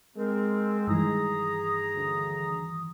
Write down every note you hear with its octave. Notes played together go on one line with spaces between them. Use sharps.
G#3 C4 A#4
G2 D#3 E3 G#4 A#5 D#6
D2